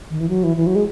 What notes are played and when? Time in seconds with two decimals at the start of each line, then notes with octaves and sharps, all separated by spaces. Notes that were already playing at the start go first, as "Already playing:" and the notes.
0.10 D#3
0.20 E3
0.29 F#3
0.44 E3
0.57 E3
0.67 F#3
0.75 G#3